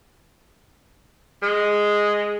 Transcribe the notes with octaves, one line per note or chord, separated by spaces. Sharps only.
G#3